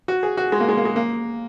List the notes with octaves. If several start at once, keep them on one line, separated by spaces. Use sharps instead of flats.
F#4
G#4
F#4
G#3
A#3
G#3
A#3
G#3
A#3